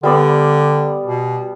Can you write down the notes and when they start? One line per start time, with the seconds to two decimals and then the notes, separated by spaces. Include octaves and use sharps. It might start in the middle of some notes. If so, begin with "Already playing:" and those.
0.03 D3 G3 B3 D5
1.06 B2